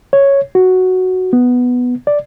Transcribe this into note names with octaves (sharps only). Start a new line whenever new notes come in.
C#5
F#4
B3
D5